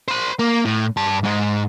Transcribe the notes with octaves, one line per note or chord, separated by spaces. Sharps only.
C5 B5
A#3
A2
G2 A5
G#2 G#3